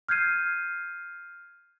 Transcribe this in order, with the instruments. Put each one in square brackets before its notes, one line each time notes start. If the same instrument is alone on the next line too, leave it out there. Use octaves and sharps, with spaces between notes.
[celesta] F6 G6 G#6 C7 D#7